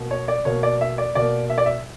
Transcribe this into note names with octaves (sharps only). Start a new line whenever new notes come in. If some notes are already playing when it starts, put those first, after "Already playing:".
Already playing: B2 A#3
C#5
D5
B2 A#3 C#5
D5
E5
D5
B2 A#3 D5
E5
D5
E5